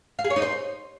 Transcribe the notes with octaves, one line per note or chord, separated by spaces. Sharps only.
F5
G#4
C#5
D#4
C5